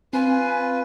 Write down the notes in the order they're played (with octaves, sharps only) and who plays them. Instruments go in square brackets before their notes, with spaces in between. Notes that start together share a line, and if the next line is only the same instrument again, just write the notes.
[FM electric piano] C4 [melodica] F4 B4 [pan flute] G#5